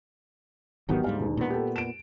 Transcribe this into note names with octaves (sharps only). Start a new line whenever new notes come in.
D1 G#1 D#3 F#3 B3 G4
D2 G#2 G3 F5
E1 D#2
A#2 B3
G4 A4
D7 E7